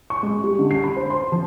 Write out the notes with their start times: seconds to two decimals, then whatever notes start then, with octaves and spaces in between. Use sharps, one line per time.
0.10 C#6
0.23 G#3
0.44 G3
0.59 D3
0.71 C7
0.84 B5
0.96 C5
1.10 C6
1.32 F3